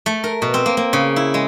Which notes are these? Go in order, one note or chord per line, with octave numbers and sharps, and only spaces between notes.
A3
A#4
B2
C4
A#3
A#3
C#3
E4
G#3